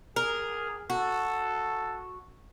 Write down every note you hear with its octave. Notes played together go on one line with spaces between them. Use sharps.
G#4 A#4
F#4 A4